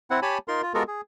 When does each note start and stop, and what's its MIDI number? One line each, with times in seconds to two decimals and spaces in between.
0.11 0.20 60
0.11 0.20 64
0.11 0.20 78
0.22 0.38 67
0.22 0.38 73
0.22 0.38 80
0.22 0.38 81
0.22 0.38 83
0.48 0.62 63
0.48 0.62 65
0.48 0.62 70
0.48 0.62 84
0.62 0.73 65
0.74 0.83 56
0.74 0.83 59
0.74 0.83 65
0.74 0.83 66
0.74 0.83 69
0.74 0.83 70
0.88 1.01 68